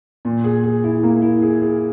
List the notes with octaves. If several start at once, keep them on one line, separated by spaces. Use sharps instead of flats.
A#2
G#4
G#4
E4
A#3
E4
G#4
G#4